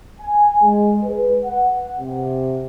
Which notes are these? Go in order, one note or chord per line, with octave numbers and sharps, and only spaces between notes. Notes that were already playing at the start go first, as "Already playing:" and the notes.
G#5
G#3
B4
F#5
C3